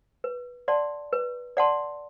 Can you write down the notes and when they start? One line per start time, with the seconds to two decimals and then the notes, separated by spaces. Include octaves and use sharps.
0.24 B4
0.68 D5 F#5 A5 C6
1.13 B4
1.57 D5 F#5 A5 C6